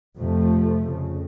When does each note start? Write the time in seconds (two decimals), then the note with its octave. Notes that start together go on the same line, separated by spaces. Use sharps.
0.18 F2 C3 F3 A3
0.83 F2 C#3